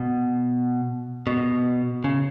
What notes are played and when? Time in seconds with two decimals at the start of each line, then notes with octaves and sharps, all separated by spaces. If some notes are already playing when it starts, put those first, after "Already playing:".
Already playing: B2
1.27 B2
2.04 C#3